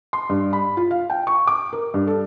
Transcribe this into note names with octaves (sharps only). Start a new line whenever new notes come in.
C6
G2
B5
F4
F5
G5
C#6
D6
A#4
G2
A4